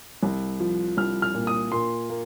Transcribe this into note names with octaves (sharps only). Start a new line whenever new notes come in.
C2
F3
C2 F6
F6
A#2
D#6
A#2 C6
A#3